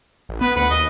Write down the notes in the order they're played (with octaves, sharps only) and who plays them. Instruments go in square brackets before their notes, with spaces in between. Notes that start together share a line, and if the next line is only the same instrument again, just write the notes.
[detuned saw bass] A1
[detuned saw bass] B3 [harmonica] B4
[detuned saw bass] D2 [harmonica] B4 F#5
[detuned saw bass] D#2 [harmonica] D#5